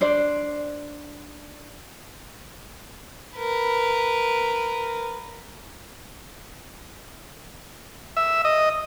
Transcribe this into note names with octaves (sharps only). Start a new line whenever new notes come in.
D4 C5 D5
A#4 B4
E5
D#5